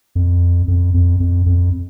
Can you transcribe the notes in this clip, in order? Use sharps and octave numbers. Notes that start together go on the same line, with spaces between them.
F2
F2
F2
F2
F2